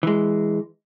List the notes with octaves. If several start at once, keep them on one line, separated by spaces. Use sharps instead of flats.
E3 G#3